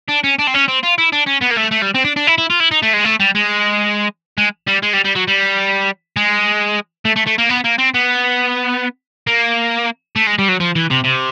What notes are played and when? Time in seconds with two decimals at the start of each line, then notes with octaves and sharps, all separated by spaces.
0.09 D4
0.24 C#4
0.39 D4
0.47 C4
0.54 C#4
0.68 C4
0.83 F4
0.98 E4
1.13 D4
1.27 C#4
1.42 B3
1.51 A#3
1.58 A3
1.72 A3
1.82 G3
1.95 C4
2.04 D4
2.16 D4
2.27 E4
2.38 E4
2.50 F4
2.60 E4
2.71 D#4
2.83 A3
2.94 G#3
3.05 A3
3.20 G3
3.35 G#3
4.38 G#3
4.67 G3
4.83 G#3
4.94 G3
5.05 G3
5.16 F#3
5.28 G3
6.17 G#3
7.05 A3
7.16 A3
7.27 A3
7.38 A#3
7.49 B3
7.64 A#3
7.78 C4
7.94 B3
9.27 A#3
10.16 A3
10.27 G#3
10.39 G3
10.49 F#3
10.60 F3
10.76 E3
10.90 C3
11.04 C3